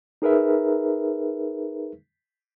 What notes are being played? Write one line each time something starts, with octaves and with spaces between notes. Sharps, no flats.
D#4 G#4 A#4 B4 E5